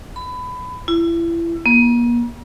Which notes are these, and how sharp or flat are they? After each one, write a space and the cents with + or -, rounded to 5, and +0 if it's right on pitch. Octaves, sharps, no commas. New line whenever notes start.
B5 +20
E4 +30
A#3 +40